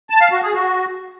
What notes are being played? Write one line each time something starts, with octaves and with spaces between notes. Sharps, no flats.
A5
F5
F#4
G#4
F#4